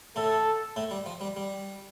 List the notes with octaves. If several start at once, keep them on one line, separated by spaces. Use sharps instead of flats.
A2 A3 A4
A2 A3
G3
F3
G3
G3